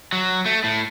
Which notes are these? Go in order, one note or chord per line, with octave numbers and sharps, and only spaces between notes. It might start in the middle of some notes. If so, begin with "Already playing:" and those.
F#3
A3
A2